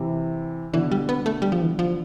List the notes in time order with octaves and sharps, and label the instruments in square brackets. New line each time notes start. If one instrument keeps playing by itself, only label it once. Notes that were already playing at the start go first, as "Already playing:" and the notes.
Already playing: [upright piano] C3 E3
[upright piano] B2 D3 [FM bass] E3
[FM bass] G3
B3
A3
G3
F3
E3
F3